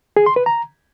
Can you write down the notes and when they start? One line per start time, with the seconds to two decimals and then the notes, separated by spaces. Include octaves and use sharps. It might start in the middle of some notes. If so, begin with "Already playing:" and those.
0.17 G#4
0.26 C6
0.36 B4
0.46 A#5